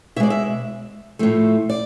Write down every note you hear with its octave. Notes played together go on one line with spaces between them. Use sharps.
B2 G#3 D5 E5
E5
A2 F3 A3
D5